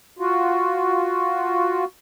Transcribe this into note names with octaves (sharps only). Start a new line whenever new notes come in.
F4 F#4